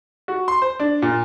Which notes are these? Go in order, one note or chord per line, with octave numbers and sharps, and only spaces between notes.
F#4
C6
C5
D4
A#2